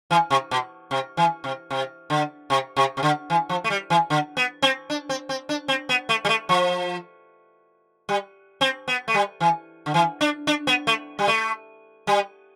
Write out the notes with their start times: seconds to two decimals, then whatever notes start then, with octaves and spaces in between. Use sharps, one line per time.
0.11 E3
0.30 C3
0.51 B2
0.91 C3
1.17 E3
1.44 C3
1.70 C3
2.10 D3
2.50 C3
2.77 C3
2.97 C3
3.03 D3
3.30 E3
3.49 F3
3.64 A3
3.70 G3
3.90 E3
4.10 D3
4.37 B3
4.62 C4
4.90 D4
5.09 C4
5.29 C4
5.49 D4
5.68 C4
5.89 B3
6.09 A3
6.25 G3
6.29 A3
6.49 F3
8.09 G3
8.61 C4
8.88 B3
9.08 A3
9.14 G3
9.40 E3
9.86 D3
9.94 E3
10.21 D4
10.47 D4
10.67 B3
10.87 A3
11.19 G3
11.28 A3
12.07 G3